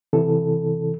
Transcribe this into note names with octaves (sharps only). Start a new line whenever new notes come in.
C3 E3 A4